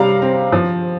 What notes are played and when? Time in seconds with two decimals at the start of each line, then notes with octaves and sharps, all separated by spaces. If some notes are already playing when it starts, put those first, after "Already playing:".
Already playing: C3 G3 F5 A#5
0.22 C4
0.52 F3